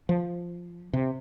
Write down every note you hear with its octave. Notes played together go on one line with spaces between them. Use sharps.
F3
C3